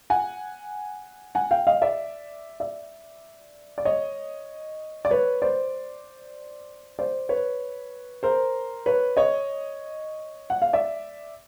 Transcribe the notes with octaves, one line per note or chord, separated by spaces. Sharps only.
F#5 G#5
F#5 G#5
F5 G5
D#5 F5
D5 E5
D5 E5
D5
C#5 D#5
D5
B4 C#5
C5 D5
C5 D5
B4 C#5
A#4 C5
B4 C#5
C#5 D#5
F#5
F5
D5 E5